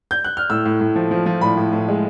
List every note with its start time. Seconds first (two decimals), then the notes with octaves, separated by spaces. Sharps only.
0.11 G6
0.24 F#6
0.37 F6
0.50 A2 E6
0.66 A2
0.81 A2
0.96 F3
1.11 F3
1.26 F3
1.41 A2 B5
1.57 A2
1.73 A2
1.88 G#3